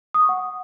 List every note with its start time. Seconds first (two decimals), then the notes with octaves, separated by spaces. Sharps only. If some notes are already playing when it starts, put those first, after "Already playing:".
0.14 D#6
0.22 C#6
0.29 F#5